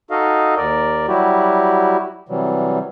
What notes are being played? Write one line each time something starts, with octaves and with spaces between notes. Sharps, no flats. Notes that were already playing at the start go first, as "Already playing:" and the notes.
D#4 F#4 A4 D#5 F5
D#2 A#4 D5
F#3 G3 E4 F#4 G4
C3 E3 F#3 G3